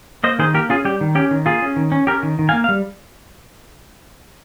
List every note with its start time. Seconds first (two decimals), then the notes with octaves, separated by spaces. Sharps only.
0.24 A#3 C5 D#5
0.39 D#3 G#4 C5
0.54 A#3 G4 A#4
0.69 C#4 F4 G#4
0.85 G3 G4
1.01 D#3
1.15 C#4 G4
1.31 D#3
1.46 A#3 F4 G#4
1.62 C#4
1.76 D#3
1.92 C#4
2.07 C#4 G4 A#4
2.23 D#3
2.39 D#3
2.49 F5 G#5
2.53 A#3
2.64 F5
2.69 G3